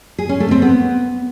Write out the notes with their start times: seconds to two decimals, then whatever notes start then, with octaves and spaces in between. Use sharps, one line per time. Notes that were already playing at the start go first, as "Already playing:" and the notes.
0.19 G#4
0.29 C#4
0.40 A3
0.51 C4
0.62 B3